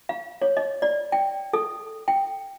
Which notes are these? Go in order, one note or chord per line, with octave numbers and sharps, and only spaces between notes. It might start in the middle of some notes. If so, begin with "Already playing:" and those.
F5
C#5
D#5
D5
G5
A4
G5